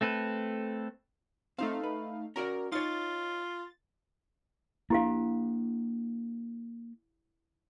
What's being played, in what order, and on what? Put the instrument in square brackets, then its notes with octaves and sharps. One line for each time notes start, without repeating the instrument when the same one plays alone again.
[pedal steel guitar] A3 C4 A4 B4
[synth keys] A3 D#4 F5 [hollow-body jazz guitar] C4
[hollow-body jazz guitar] B4
[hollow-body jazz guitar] C#4 F#4 D5 [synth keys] A#4
[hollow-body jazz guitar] D#4 C#5 [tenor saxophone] F4 [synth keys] A6
[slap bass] A#3 D4 [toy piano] E4 G4 F5